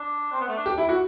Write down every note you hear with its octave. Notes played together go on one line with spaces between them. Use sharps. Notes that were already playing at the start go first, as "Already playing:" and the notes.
Already playing: D4
C4
B3
A3
D4
G4
E4
F#4